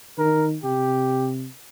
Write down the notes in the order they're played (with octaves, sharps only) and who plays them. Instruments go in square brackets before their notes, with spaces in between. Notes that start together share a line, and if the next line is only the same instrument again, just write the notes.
[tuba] D#3 [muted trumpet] A#4
[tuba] C3 [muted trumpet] G4